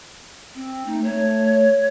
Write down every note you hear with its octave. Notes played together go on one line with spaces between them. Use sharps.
C4
A3 D#4
A3 C#5